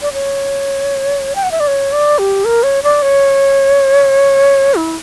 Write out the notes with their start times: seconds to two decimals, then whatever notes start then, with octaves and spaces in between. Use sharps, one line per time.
0.02 D5
0.13 C#5
1.35 G5
1.43 F#5
1.51 E5
1.60 D5
1.67 C#5
1.92 D5
2.19 G4
2.45 A#4
2.63 C#5
2.83 D5
3.02 C#5
4.75 E4